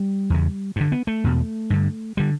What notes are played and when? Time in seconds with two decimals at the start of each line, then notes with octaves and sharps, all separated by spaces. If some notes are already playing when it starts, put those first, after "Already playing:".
Already playing: G3
0.30 E2 C#3
0.76 G2 D3
0.92 B3
1.07 A3
1.24 E2 B2
1.70 G2 D3
2.17 D3 G3